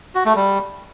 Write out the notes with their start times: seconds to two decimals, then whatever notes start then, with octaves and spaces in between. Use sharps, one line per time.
0.15 F#4
0.25 A3
0.35 G3